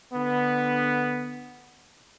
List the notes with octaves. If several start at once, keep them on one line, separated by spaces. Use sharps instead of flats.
D3 B3